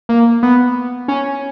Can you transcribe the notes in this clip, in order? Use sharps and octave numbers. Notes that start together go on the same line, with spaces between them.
A#3
B3
C#4